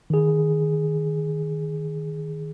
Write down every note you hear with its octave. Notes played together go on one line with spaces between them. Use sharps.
D#3 G#4